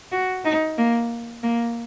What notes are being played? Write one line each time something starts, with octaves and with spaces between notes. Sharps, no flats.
F#4
D#4
A#3
A#3